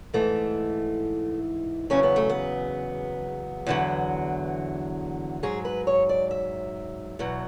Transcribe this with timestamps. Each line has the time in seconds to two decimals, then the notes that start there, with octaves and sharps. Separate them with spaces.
0.14 G#2 E3 A3
1.90 E2 C#3 F#3 C#4
2.03 B3
2.16 A3
2.29 B3
3.66 E2 D3 F#3
5.43 G#2 F#3 G#4
5.65 B4
5.87 C#5
6.09 D5
6.31 E5
7.19 E2 B2 F#3